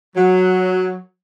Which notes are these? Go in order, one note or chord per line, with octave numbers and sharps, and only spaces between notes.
F#3